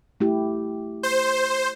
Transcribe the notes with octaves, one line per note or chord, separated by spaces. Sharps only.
A3 E4 G4
C5